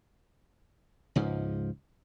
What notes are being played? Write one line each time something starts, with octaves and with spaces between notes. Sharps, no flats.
C#2 G#2 F3